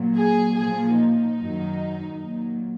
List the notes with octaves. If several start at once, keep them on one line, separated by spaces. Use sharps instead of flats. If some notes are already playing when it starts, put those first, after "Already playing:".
Already playing: A#2 F#3
G#4
A#2 F3 G#4
D#4
F#2 D#3 F#3
A#2 F#3